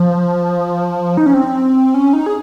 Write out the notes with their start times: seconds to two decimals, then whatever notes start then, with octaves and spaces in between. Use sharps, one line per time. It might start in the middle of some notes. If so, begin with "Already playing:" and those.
Already playing: F3
1.17 D#4
1.26 C#4
1.34 C4
1.94 C#4
2.13 D#4
2.26 G#4